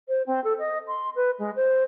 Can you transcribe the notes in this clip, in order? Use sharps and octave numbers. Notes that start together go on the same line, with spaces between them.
C5
C4
A4
D#5
C6
B4
G#3
C5